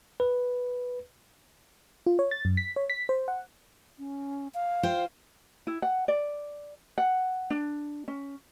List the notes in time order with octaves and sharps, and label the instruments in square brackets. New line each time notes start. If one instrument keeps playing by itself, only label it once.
[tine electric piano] B4
[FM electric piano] F4
C#5
A6
F#2
B6
C#5
B6
C5
F#5
[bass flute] C#4
F5
[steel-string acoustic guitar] F4 C5 G5
[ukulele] E4
F#5
D5
F#5
D4
C#4